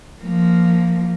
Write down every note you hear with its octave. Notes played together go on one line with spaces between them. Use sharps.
F3 A#3